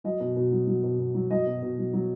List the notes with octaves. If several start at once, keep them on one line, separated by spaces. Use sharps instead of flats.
F#3 D#5
B2
B2
F#3
F#3
B2
B2
F#3
F#3 D#5
B2
B2
F#3
F#3